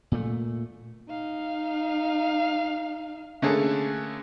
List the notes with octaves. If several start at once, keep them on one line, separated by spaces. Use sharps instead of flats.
A#2 A3
D#4 F5
D3 A3 A#3 C#4 G#4 A4